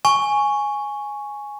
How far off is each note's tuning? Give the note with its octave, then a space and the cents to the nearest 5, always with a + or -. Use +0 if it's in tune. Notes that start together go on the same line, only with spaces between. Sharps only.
G#5 +0 C#6 +0